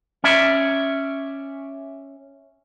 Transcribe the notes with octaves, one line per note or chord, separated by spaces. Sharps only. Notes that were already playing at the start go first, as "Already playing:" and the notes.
C#4 D5 E5